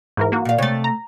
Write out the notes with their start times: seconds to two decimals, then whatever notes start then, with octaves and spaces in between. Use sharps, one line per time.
0.17 G#2 E3 A#4
0.32 A#3 F#4
0.45 A#2 F5
0.58 C3 A3 C#5 A6
0.84 A#5